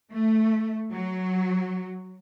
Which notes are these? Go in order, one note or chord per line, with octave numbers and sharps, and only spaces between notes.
A3
F#3